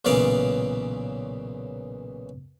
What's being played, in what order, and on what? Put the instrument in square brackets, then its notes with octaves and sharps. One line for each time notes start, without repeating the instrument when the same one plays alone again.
[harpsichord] B1 A#2 C#3 E3 D5 F5